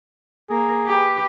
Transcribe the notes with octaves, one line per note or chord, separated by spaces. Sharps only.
A#3 G#4 A#4
G4 B4